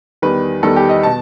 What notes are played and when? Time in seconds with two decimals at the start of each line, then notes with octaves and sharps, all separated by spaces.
0.22 E2 D#3 G3 B4
0.63 E2 D#3 G3 A4
0.76 G4
0.89 D#5
1.03 B2 A5